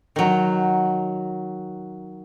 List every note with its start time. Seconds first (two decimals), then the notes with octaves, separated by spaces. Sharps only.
0.16 D#3 F#3